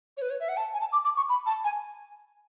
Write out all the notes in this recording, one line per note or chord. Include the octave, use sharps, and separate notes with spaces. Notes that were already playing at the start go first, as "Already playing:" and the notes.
C#5
B4
C#5
E5
F#5
A5
G#5
A5
D6
D6
C#6
B5
A5
G#5